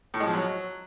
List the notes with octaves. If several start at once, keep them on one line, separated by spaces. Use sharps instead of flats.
A2
G#3
F3
F#3